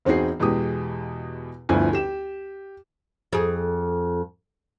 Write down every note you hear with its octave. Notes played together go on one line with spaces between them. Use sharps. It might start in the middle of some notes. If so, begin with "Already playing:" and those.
E1 C4 D#4 F#4 G#4 C7
E2 B2 G#3 G4 D#6
G1 D2 F3 E4 B4 G#5
G4 E7
F2 G#4